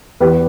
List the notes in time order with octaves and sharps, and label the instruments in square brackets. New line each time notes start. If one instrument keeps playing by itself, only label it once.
[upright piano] E2 G4 B4